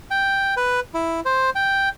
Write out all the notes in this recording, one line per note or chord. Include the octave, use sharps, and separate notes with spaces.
G5
B4
E4
C5
G5